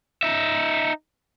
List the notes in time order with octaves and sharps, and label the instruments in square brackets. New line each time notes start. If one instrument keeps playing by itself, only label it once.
[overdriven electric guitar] D#4 E5